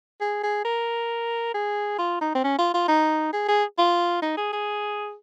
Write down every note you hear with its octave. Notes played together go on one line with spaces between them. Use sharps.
G#4
G#4
A#4
G#4
F4
D#4
C4
C#4
F4
F4
D#4
G#4
G#4
F4
D#4
G#4
G#4